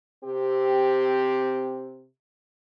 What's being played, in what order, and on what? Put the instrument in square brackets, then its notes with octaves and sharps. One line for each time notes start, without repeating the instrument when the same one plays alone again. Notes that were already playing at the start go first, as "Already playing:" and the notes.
[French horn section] C3 C4 G4